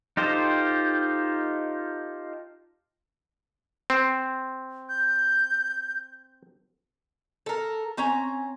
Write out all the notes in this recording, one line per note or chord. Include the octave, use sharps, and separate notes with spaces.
D#4 F4 G4 A4 C5
C4
G6
A4 A#4
C4 C#4 G#5 A#5